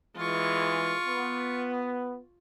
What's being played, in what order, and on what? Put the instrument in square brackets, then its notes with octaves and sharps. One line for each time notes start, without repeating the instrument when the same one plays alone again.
[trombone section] E3 G#3 [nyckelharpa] F4 C#6
[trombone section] B3